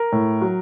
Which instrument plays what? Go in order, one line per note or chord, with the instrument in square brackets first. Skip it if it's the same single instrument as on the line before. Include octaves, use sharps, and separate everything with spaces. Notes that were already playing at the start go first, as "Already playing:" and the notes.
Already playing: [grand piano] A#4
A2
F#3